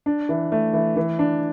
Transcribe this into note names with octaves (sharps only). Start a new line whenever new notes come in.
D4
E3
A3
E3
E3
D4